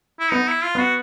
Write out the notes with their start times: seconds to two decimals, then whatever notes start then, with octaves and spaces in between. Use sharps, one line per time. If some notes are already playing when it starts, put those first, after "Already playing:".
0.20 E4
0.31 B3 D#4
0.48 E4
0.64 F4
0.75 B3
0.80 F#4